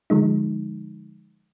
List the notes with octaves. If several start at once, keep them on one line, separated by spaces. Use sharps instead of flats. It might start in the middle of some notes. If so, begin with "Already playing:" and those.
D3 F3 G#3 D#4